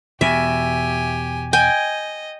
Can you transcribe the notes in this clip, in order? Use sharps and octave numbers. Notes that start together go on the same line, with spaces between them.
E2 B2 G4 E5 G#5
D#5 G5 G#5